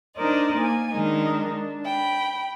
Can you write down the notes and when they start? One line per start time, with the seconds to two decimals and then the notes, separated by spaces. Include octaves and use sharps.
0.17 D4 D#4 A#4 C5 D5 D#5
0.58 A#3 G#5
0.91 D#3 G#3 D4 D#4 A#4
1.54 D4
1.85 G5 B5